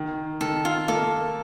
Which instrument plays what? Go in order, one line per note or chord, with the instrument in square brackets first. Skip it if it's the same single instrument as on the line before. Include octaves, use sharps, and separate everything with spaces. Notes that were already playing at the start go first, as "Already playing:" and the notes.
Already playing: [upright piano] D#3
[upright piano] D#3 [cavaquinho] A4
[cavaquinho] F4
[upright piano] A#3 [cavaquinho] A4